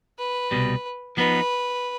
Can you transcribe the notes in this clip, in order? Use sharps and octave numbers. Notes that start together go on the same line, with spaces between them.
B4
C2 B2 G3
F3 B3 D#4 B4